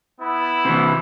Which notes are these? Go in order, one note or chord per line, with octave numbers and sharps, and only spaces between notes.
B3 E4
C3 E3